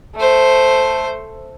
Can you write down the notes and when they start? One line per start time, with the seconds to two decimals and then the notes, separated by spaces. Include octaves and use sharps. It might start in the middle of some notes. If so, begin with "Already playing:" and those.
0.16 A3 C5